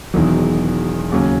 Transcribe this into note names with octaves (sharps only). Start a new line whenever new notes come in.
E1 E2 D#3 F#3
D#2 C#3 F#3 C#4